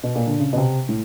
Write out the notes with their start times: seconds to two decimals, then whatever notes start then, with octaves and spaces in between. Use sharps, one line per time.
0.03 B2
0.15 A#2
0.27 D3
0.40 C#3
0.53 B2
0.57 C3
0.89 A2